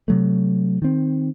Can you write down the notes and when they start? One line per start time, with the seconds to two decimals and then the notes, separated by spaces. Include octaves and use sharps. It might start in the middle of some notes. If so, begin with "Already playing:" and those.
0.08 C3 F#3 A3
0.82 D#3 C4